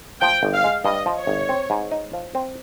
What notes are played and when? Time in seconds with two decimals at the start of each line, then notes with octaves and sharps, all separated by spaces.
0.22 F3 G5
0.43 G1
0.54 F5
0.64 G#3
0.85 G2 D#5
1.06 F3
1.17 C#5
1.27 G1
1.49 C4
1.70 G#2
1.91 D#4
2.13 F3
2.35 C4